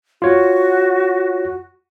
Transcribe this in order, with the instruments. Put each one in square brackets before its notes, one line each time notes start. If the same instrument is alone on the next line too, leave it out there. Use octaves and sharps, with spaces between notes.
[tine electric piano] F4 C#5 [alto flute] F#4